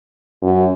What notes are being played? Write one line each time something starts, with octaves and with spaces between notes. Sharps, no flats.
F#2